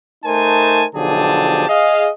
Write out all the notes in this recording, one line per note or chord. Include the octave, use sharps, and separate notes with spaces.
A3 D#4 A#4 C5 G#5 A5
B1 D3 F3 G4 G#4 A5
G#4 D#5 F5